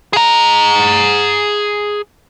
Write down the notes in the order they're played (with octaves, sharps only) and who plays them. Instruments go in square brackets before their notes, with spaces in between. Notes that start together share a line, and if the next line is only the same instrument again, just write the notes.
[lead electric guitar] G#4 A#5